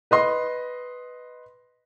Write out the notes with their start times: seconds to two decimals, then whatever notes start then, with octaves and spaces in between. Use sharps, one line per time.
0.11 B4 D#5 C6